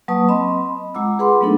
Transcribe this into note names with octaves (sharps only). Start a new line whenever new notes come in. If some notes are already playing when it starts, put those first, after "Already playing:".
F#3 A#3 B4 A5 C#6 D#6
C4 D#5 B5 C6
G#3 F4 F#5 A#5 D6 E6
G#4 B4 F#5 B5 C6 D6
F#3 A3 B3 D4 D#4 A4